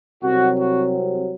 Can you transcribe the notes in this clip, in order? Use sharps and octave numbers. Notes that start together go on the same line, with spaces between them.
C2 C3 F#3 C4 F#4
F#4